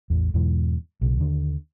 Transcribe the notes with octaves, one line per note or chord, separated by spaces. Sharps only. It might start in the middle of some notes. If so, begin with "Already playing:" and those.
A1 E2
E2 G#2 B2 E3
B1 C#3
D#2 D3